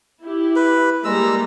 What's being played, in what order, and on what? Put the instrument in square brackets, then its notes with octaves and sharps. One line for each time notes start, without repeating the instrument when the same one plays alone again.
[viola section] E4 G4
[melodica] B4
[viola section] G3 A#3 A#5 [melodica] G#3 E6